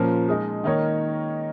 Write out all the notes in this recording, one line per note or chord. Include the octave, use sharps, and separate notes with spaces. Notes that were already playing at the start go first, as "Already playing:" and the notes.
Already playing: A#2 F3 A#3 C#4 F4
G#3 D#4 G#4
D#3 A#3 D#4 A#4 C#5